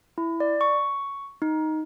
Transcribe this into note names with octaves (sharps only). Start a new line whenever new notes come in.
E4
D5
C#6
D#4